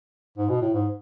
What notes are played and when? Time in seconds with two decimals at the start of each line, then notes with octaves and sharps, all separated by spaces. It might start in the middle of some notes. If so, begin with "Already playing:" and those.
0.38 G#2
0.49 B2
0.61 A2
0.74 G#2